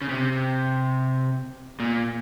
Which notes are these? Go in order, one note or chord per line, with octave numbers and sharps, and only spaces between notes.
C#3
C3
A#2